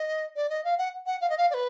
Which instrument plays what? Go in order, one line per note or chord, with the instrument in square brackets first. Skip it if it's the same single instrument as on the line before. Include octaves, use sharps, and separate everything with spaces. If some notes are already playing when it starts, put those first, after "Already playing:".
Already playing: [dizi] D#5
D5
D#5
F5
F#5
F#5
F5
D#5
F5
D5
B4